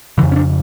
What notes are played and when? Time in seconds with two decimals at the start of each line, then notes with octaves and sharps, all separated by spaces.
0.18 C#3 E3
0.23 F2
0.32 C#4
0.36 D4